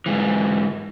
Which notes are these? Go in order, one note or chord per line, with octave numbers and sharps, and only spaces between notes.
G#2 E3